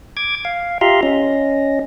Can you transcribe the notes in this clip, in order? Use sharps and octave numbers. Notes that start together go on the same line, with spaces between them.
D6 G#6
F5
F4 G4 E5 F5 A#5 C6
C#4 D#5